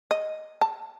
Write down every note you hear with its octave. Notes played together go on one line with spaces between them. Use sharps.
D#5
A5